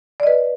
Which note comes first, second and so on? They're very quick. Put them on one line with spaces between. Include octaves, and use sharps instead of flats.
D5 D#5 B4